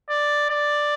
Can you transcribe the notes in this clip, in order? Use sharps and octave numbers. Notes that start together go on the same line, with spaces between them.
D5
D5